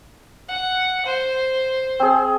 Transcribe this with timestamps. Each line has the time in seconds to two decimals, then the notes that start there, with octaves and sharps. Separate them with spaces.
0.49 F#5
1.06 C5
2.00 C4 G#4